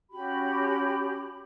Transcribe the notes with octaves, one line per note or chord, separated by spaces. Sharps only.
C#4 F#4 G4 B5